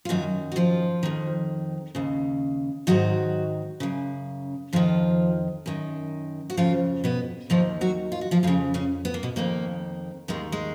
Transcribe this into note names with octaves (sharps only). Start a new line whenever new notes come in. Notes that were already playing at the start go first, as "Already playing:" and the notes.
F4
F#2 D#3 F#3 F#4
F#4
F3 F4
F2 D#3
D#2 C#3
G#2 D#3 F#3 F#4
F#2 C#3
F2 D#3 F3 F4
F#2 D#3
F#4
F2 C#3 F3 F4
B2 B3
D#2 D#3 F3 F4
F#3 F#4
F4
F#4
F3 F4
F2 C#3 F3 F4
C#3 C#4
B3
A#3
B2 B3
F2 D#3 A#3
D#2 D#3 G#3
G#3